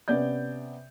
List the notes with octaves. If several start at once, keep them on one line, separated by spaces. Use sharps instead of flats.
C3 B3 C#4 D5 G6